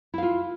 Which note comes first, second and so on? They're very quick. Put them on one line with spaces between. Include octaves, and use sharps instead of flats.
E4 F5 F4